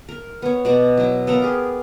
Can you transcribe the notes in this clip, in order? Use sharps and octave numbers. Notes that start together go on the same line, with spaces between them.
A#4
B3 C#5
B2 D5 F#5 A#5
F#3 E4
B3 A4 A#4 F5
G4 G#4